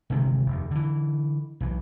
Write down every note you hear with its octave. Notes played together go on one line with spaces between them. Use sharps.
G1 C3 D#3 G#3
F1 D#2
D3 E3
B1 E3